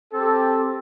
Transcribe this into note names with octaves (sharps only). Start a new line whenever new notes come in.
C4 G4 A4